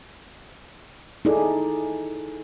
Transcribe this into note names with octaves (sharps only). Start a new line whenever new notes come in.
D#4 E4 G#4 A4 D5